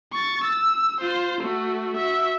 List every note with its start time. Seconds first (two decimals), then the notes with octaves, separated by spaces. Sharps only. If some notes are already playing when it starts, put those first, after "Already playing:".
0.12 C#6 A6
0.44 E6
1.00 F4 C5
1.41 A3 F#4
1.97 F#4 E5